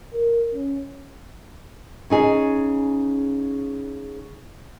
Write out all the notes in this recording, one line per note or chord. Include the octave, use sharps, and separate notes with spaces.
A#4
C#4
C#3 D#4 G#4